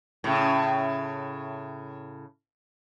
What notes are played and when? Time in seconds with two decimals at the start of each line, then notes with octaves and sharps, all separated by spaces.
0.24 A2 C#3